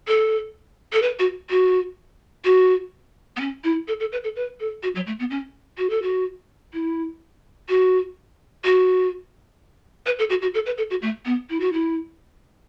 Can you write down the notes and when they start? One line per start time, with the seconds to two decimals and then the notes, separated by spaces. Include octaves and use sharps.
0.08 A4
0.93 A4
1.02 B4
1.19 F#4
1.50 F#4
2.45 F#4
3.36 B3
3.40 C#4
3.64 E4
3.88 A4
4.00 A4
4.12 B4
4.24 A4
4.36 B4
4.60 A4
4.83 F#4
4.95 F#3
5.07 A3
5.19 B3
5.31 C#4
5.78 F#4
5.90 A4
6.02 F#4
6.73 E4
7.69 F#4
8.64 F#4
10.06 B4
10.19 A4
10.30 F#4
10.42 F#4
10.54 A4
10.66 B4
10.78 A4
10.90 F#4
11.02 A3
11.25 B3
11.50 E4
11.60 F#4
11.73 E4